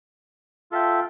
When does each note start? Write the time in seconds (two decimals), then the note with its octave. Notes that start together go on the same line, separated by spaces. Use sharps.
0.72 F4 A4 E5 G5